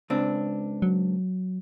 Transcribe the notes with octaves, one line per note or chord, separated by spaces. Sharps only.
C#2 C4 D4
F#3